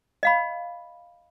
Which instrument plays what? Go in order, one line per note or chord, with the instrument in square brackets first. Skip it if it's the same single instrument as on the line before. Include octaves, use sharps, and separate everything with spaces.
[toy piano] D#5 F5 B5